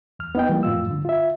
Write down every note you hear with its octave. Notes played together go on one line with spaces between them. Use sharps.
E2 F6
B3 D#4 D#5 G5
E3 G3 A#3
F2 A2 F4 E6
G2 D3
F4 E5